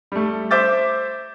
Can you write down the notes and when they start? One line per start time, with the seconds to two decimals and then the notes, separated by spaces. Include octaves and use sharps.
0.12 G3 A3
0.51 C5 E5 D6 G6 A6